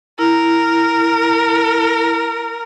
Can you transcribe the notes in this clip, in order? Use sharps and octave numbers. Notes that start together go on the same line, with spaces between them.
E4 A#4